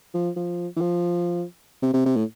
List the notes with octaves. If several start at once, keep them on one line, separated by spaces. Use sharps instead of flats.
F3
F3
E3
F3
C3
C3
C3
A2